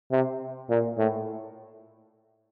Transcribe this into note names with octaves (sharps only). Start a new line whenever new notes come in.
C3
A#2
A2